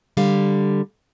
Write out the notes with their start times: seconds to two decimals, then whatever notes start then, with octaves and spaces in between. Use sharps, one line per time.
0.17 D3 G3 F5